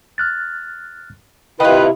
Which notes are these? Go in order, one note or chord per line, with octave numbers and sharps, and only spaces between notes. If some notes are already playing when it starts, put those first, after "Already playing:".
F6 F#6 A6
C3 D#3 E4 F4 B4 G5